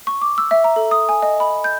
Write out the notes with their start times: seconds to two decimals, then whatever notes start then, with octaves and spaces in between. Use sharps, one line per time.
0.07 C#6
0.22 D6
0.38 E6
0.51 E5
0.64 A#5
0.76 A4
0.91 D#6
1.09 G#5
1.22 D#5
1.40 B5
1.64 G6